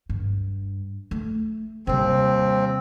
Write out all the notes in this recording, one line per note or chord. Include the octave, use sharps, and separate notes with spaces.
G2
A3
D#2 C3 G3 C4